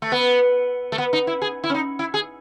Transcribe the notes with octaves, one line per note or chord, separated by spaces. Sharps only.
A3
B3
A3
B3
D#4
E4
G#4
E4
C#4
D#4
E4
G#4